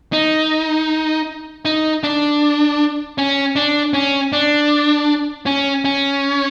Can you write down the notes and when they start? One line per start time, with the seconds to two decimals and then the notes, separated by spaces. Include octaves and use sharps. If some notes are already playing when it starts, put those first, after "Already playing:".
0.13 D#4
1.65 D#4
2.03 D4
3.18 C#4
3.56 D4
3.93 C#4
4.32 D4
5.46 C#4
5.85 C#4